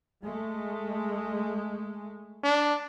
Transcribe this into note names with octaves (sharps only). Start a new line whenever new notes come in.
G#3 A3
D4